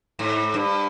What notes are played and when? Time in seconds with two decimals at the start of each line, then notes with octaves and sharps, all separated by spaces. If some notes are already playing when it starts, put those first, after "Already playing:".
0.19 G#2
0.54 G2